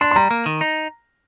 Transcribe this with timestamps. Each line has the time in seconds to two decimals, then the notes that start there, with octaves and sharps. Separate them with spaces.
0.01 D4 C6
0.11 C6
0.16 G3 A#5
0.31 A#3
0.46 D#3
0.61 D#4